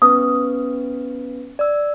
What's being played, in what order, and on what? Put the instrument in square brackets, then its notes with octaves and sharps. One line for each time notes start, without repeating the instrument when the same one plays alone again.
[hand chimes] B3 C#4 B4 [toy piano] D#6
[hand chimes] D5 E6